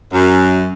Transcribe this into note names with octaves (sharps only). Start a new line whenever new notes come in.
F#2